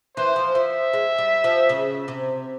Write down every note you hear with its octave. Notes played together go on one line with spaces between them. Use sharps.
E3 C5
F3
F3 E5
G#3
G3
F3
C#3
C3